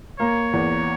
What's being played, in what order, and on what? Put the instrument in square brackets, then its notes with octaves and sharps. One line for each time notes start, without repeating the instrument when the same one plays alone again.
[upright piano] A#3 [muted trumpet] C#5
[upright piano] E2